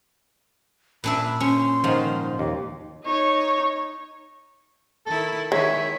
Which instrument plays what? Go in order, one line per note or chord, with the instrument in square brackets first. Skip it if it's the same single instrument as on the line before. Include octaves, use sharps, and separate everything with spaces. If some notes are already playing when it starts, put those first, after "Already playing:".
[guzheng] A#2 D4 E5 [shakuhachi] B5
[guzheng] C#4 [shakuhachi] C6
[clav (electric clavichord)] G#2 D#3 [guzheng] F3
[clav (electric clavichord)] D#2 [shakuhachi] D6
[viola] D#4 C#5
[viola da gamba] D#3 E4 [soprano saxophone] A4
[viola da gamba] D#3 E4 [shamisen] G#3 [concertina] C#5 [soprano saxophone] E5